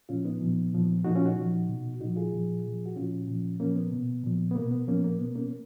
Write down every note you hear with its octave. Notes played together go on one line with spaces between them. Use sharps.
A#2 F3 C#4 F4
B3 D#4
A#2 F3
A#2 F3
A#2 F3 D#4 F#4
C#4 F4
D#4 F#4
A#2
F3
B2
A#2 F3 D#4 F#4
F4 G#4
A#2 F3
A#2 F3
F#4
A#2 F3 C#4 F4
A#2 F3
A#2 F3 A#3 C#4
B3
B2
A#2 F3
B3
B2 A#3
B3
A#2 F3 A#3 C#4
A#3
B2 B3
A#3 C#4